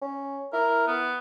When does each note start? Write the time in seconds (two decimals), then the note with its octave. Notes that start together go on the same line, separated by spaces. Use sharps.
0.02 C#4
0.53 E4 A#4
0.87 B3